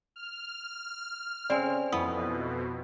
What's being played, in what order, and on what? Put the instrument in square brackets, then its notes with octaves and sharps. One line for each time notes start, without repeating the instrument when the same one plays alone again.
[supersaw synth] F6
[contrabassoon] C#3 [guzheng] C4 [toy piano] D5 G#5
[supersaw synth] F2 B2 [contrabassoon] E3 [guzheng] B3 [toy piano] D#6